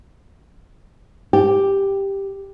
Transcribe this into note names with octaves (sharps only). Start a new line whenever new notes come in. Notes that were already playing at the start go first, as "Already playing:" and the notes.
G4